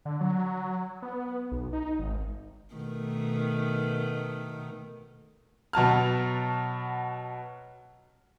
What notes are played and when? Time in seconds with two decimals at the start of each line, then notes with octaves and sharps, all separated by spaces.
0.05 D3
0.21 F#3
1.02 B3
1.51 B1
1.73 D#4
1.99 G#1
2.74 B2 D#3 A3
5.73 B2 F#3 A5 F6